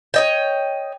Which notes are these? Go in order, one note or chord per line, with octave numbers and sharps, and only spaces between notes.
C#5 D#5 G5